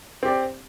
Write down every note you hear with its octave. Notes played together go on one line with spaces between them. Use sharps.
C4 G4 D5